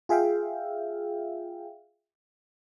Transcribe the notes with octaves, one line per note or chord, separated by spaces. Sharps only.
F4 G#4 E5 F5 G5